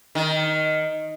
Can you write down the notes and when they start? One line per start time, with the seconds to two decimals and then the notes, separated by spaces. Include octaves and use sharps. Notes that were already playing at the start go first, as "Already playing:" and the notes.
0.15 D#3